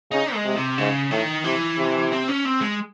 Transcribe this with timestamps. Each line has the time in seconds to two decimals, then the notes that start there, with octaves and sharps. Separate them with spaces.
0.11 C#3 D#4
0.34 G#3
0.45 C3
0.56 C3
0.78 G#2 C#3
1.11 A2 D#3
1.44 C3 E3
1.78 C3
2.12 C4
2.28 C#4
2.46 C4
2.61 G#3